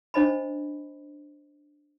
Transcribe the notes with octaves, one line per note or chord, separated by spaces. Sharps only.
C#4 D4 C5 D#5 A5 B5